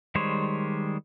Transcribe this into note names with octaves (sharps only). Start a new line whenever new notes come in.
D#3 G3 G#3 C5 C#5